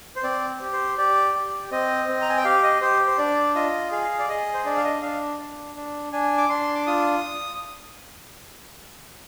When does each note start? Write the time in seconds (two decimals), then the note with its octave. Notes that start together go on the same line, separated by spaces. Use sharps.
0.16 C5
0.23 C4 D5
0.61 G4
0.73 C5
0.98 G4 D5
1.34 G4
1.71 C4 D#5
2.08 C4
2.22 A#5
2.29 G#5
2.37 G5
2.44 G4 F5
2.63 D#5
2.82 G4 C5
3.07 C5
3.18 D4 D5
3.55 F4 D#5
3.91 G#4 F5
4.19 D5
4.29 G#4 D#5
4.54 C5
4.65 D4 D5
4.76 F5
4.84 D#5
5.02 D4 F5
5.40 D4
5.76 D4
6.13 D4 G#5
6.38 D6
6.49 D4 C6
6.75 D6
6.87 F4 D#6